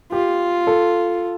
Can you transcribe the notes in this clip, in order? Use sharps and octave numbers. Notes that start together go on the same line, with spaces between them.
F4 G4
A4